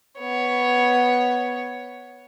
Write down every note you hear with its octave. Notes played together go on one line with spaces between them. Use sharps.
B3 C#5